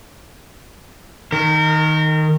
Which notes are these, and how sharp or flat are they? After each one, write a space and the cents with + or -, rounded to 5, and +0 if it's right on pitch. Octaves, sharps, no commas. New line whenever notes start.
D#3 +5 A#4 -30